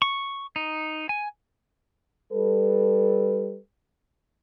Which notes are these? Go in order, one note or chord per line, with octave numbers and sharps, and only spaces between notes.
C#6
D#4
G#5
G3 A4 B4